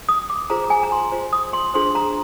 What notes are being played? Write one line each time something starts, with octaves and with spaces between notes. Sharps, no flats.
D#6
D6
F4 G#4 C5 A#5
A#5
G#5
A#5
C6
F4 C5
D#6
C6
D4 F4 G#4 C5 C6
A#5